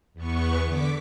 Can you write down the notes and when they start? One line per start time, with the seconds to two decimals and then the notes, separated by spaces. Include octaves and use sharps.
0.14 E2 B3 C#6
0.65 D3 D6 B6